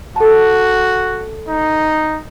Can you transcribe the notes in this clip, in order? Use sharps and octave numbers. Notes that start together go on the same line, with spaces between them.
F#4 A4 A5
D#4